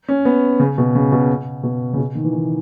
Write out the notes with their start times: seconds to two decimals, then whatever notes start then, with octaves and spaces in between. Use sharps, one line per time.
0.09 C#4
0.25 B3
0.60 C#3
0.78 B2
0.95 C#3
1.12 B2
1.63 B2
1.93 C#3
1.98 B2
2.15 D#3
2.24 E3
2.33 D#3